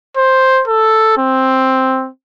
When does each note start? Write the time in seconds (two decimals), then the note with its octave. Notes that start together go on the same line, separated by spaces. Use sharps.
0.17 C5
0.68 A4
1.18 C4